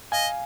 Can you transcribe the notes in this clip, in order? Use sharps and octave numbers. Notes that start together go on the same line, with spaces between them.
D#5 F5 G#5